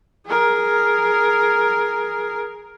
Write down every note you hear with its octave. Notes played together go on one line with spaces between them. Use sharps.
G#4 A#4